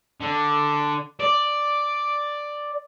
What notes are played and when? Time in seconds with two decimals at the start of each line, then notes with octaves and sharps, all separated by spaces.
0.21 D3
1.20 D5